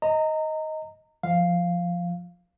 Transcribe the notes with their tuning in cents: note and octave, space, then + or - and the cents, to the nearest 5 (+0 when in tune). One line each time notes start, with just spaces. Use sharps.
D#5 +10 A#5 -25
F3 +0 F5 +0